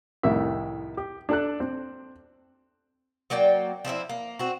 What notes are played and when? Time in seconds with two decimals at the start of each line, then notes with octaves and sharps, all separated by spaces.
0.23 C2 F2 A2 D#3 E5
0.97 G4
1.29 D4 A4 F#6
1.60 C4
3.30 F#3 A#3 D5 G5
3.85 F3 C4 D4 E4
4.09 A#3
4.39 C4 F#4